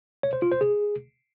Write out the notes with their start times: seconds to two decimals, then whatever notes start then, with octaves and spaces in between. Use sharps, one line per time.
0.23 C#5
0.33 C5
0.42 F4
0.52 C5
0.61 G#4